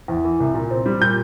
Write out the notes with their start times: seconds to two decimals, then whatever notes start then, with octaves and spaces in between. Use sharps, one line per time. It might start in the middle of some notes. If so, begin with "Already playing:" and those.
0.08 E2
0.25 E3
0.40 C2
0.55 A#2
0.71 C4
0.86 G3
1.01 A#2 G6